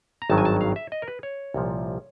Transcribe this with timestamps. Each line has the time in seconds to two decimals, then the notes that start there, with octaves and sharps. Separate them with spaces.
0.22 A#5
0.30 G#1 G2 D#3 F#3 A5
0.38 G#5
0.45 A5
0.61 F5
0.76 E5
0.92 D#5
1.02 A#4
1.08 B4
1.23 C#5
1.54 C2 A#2 F3